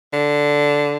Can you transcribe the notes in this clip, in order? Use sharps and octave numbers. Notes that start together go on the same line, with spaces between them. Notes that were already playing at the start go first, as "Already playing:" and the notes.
D3